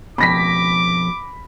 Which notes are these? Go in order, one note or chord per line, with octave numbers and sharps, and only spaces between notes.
F2 B2 B5 D6 A#6 B6